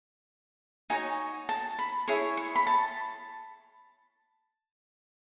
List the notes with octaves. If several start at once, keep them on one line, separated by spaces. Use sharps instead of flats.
D#4 F#4 C#5 G#5
A5
B5
E4 G#4 C#5 C#6
C#6
B5
A5